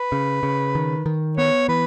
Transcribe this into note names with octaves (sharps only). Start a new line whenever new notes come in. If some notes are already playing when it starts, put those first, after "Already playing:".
Already playing: B4
C#3
C#3
D#3
D#3
B3 C#5
E3 B4